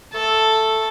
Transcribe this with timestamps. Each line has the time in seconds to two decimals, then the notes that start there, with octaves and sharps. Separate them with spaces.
0.14 A3 A4